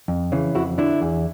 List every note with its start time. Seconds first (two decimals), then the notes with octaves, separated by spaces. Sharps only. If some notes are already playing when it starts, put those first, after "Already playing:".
0.08 F2
0.32 C#3 E3
0.55 F2 E4 F#4
0.78 D3 D4 E4
1.01 E2